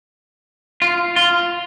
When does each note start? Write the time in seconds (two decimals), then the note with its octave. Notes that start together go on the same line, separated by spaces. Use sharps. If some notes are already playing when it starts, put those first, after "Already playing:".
0.82 F4
1.16 F4